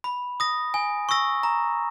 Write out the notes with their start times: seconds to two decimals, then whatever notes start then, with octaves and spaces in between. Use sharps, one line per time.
0.04 B5
0.40 D#6 A#6
0.74 G#5
1.09 C#6 E6 A#6
1.43 A#5